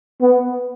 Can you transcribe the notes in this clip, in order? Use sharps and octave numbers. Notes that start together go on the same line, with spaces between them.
B3